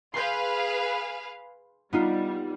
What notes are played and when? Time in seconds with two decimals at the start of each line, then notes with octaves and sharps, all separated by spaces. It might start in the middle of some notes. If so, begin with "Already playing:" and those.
0.14 G#4 B4 F5 C6 G6
1.93 G3 B3 D#4 F4